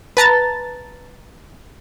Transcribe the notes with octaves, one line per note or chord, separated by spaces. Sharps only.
B4 A5 A#5 A6